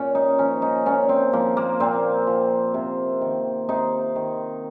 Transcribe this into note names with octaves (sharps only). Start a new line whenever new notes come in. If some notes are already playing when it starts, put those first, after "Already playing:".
Already playing: A#2 C#4
D#4
F3 C#4
D#4
A#2 C#4
C4
F3 A#3
A#3
A#2 C4
F3
C3
D#3
C3 D#4
D#3